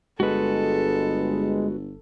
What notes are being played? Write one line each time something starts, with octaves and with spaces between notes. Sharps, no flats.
G1 G#3 F#4 A4 B4